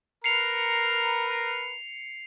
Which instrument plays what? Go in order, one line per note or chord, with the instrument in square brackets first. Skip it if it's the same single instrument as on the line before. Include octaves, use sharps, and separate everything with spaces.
[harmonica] A#4 B4 A#5 [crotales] C7 C#7 F7